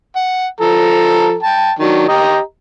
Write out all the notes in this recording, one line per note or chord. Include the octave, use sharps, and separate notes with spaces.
F#5
F3 A4 A#5
G5 A5
D#3 F#3 D4
G4 D#5 A#5